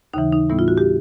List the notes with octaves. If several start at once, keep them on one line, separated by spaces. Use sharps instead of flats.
D#2 C#3 E3 D#4
D#4
A2 E3 G3 B3 E4
F4
F#4
G4